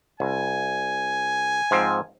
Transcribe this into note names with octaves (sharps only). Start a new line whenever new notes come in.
C2 G#5
G#2 F3 C4